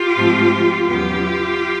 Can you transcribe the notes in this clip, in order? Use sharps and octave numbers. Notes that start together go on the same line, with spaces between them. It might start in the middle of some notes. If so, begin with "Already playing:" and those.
Already playing: F4 G4
G#2 F3 A3 C4
E2 C#3 F#3 B3 F4 G4